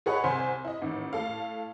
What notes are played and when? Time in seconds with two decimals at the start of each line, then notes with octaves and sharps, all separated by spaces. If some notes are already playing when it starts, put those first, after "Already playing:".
0.06 G#4 A4 B4 C#5 D#5 F#5
0.24 C2 C5 G#5 C6
0.65 E4 D#5
0.81 A1 D#3
1.13 A2 A4 F5